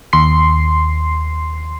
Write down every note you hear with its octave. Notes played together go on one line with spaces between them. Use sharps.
D#2 C6 C7